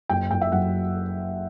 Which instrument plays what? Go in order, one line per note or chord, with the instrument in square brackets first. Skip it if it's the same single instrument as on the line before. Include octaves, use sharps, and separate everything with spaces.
[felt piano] F#1 G5
F#1 G5
E5
F#2 F#5